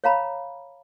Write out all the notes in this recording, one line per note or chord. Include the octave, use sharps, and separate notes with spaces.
C#5 F5 A#5 B5